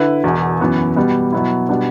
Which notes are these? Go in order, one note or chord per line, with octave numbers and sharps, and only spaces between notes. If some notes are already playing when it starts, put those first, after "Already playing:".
Already playing: D3 E4 B4
E1 E2 B2
F#2 E3 B3 F#4
B2 G3 B3
B2 F#3 B3 E4
B2 G3 B3 D4